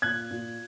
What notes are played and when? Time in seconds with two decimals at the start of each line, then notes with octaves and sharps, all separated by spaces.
0.02 A#2 F#6 G#6
0.31 A#2